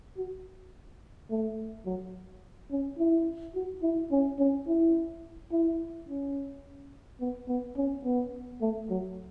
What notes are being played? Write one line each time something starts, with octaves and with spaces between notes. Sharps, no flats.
F#4
A3
F#3
C#4
E4
F#4
E4
C#4
C#4
E4
E4
C#4
B3
B3
C#4
B3
A3
F#3